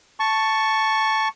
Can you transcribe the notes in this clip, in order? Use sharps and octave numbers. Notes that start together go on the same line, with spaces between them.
A5 C#6